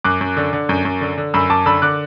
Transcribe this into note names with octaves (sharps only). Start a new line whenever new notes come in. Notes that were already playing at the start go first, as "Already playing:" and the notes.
F#2 D6 F#6
F#2
D3
D3
F#2
F#2
D3
D3
F#2 B5 E6
F#2 A5 D6
D3 B5 E6
D3 D6 F#6